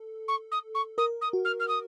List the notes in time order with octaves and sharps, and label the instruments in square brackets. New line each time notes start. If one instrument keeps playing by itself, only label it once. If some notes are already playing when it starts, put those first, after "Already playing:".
Already playing: [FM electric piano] A4
[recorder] C#6
D#6
C#6
[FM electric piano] A#4 [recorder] D#6
[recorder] D#6
[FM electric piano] F#4
[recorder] F6
F6
D#6